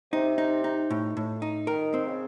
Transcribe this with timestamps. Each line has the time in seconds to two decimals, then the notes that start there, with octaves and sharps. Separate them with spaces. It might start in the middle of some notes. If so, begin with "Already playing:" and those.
0.12 C3 D#4
0.38 D#4
0.64 D#4
0.90 A2
1.17 A2
1.42 D#4
1.67 D#3 A#4
1.94 C4
2.07 C#3